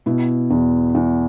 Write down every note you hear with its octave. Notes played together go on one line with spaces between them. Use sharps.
B2 E4
E2
E2